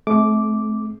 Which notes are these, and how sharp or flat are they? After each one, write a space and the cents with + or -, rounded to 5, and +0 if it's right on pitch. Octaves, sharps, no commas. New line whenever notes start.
A3 -35 C4 +0 D6 -5